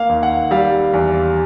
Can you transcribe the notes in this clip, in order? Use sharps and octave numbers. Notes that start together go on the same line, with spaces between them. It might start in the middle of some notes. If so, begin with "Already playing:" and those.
Already playing: A#3 F5
D#2
F#5
G3 F5
E2